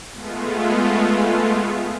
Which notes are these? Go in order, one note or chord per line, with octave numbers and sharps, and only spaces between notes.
G#3 A3 B3 F4